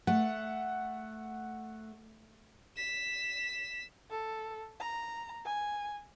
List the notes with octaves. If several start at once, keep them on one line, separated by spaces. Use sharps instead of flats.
A3 F#5
B6 E7
A4
A#5
G#5